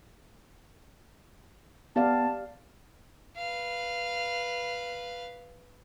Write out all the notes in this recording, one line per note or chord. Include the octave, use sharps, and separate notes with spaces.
B3 G4 D5 F5 A5
B4 F5